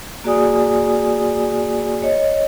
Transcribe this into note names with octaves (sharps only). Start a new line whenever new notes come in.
A#3 F#4 G#4 D5 G#5 D#6
C#5 D#5